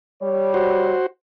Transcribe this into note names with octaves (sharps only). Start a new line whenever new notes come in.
G3 C#5
F#4 C5